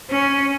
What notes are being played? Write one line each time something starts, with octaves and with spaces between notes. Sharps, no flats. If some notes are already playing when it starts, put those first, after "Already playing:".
C#4